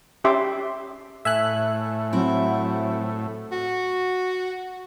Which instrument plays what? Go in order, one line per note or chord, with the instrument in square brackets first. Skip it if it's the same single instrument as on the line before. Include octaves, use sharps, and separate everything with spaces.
[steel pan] C#4 G4 E5 C6 D6
[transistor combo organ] A2 [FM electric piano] E5 G#5 F#6
[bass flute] F#3 [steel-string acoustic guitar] C4 E4
[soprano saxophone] F#4